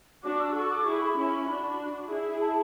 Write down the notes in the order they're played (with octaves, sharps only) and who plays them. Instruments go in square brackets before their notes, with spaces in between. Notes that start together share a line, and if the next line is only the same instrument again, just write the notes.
[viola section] D4 F#4 [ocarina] D6
[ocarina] E6
[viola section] F#4 A4 [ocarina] C#6
[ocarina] D6
[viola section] E4 G#4 [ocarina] C#6
[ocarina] B5
[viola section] C#4 E4
[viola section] D4 F#4 [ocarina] B5
[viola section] E4 G#4
[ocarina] A5